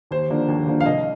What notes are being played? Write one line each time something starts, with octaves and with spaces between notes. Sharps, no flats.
D#2 C5
D3 F3 A#3 D4
D#2
D3 F3 A#3 D4
F5
C2 D#5